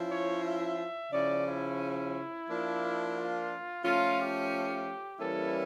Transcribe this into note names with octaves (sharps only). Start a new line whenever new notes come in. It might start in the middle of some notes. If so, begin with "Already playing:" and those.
Already playing: F3 C#4 E4
C#5
E5
C#3 F3 C#4 E4 D5
E4
F3 A#3 D4
F4
F3 A3 C#4 F4
G4
E3 G3 A#3 C#4 E4 A4